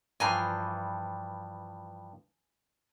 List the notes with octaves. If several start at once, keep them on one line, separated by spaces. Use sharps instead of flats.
G2 E3 F3 G#5 A#5 C6